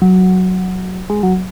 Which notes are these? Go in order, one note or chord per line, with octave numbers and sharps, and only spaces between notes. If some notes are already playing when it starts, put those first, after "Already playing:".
F#3
G#3
F#3